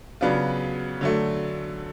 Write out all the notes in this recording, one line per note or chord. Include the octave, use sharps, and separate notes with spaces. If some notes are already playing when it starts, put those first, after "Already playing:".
C#3 F#3 B3 D4 F4
D3 F#3 A3